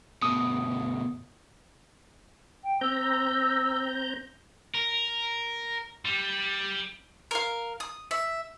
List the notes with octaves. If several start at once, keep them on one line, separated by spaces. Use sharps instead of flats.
D2 B2 D#6
G5
C4 A#5 E6 G6
A#4
G3
A#4 F5
D#6
E5